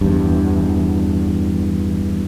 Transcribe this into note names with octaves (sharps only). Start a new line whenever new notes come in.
E2 G2